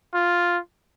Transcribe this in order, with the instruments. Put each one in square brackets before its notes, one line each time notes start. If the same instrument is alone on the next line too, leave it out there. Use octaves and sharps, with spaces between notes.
[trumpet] F4